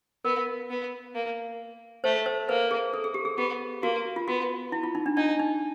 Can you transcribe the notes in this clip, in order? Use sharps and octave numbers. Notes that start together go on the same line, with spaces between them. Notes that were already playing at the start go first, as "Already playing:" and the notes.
B3 A#4
B3
A#3
A3 C5
C5
A#3 B4
G#4
A4
G#4
G4
G#4
B3 G4
A#3 F#4
F4
B3 F#4
E4
F4
D#4
D4
D4 D#4
D#4